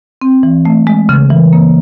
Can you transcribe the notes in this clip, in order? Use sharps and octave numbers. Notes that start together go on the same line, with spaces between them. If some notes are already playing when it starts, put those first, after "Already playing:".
C4
E3
A3
G#3
C#3
E3
A#3